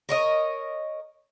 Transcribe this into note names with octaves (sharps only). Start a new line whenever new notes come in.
A#4 C#5 D#5